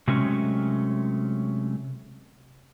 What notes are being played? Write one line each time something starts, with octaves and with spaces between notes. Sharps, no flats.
C3 F#3 G#3 A3 C#4